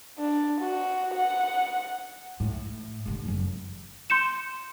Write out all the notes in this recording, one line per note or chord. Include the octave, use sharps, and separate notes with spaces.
D4
F#4
F#5
A2
G1 D3
F#1 F#3
C6 G6 C#7 E7